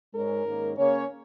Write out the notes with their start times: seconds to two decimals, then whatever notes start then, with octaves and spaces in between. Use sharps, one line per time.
0.13 G#2 G#3 C#4 A#4
0.45 G#2 D#3 A#3 C#4
0.76 C#3 A#3 C#4 C#5